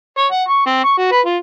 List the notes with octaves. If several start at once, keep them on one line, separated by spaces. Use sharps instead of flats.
C#5
F#5
C#6
C4
C#6
F#4
B4
F4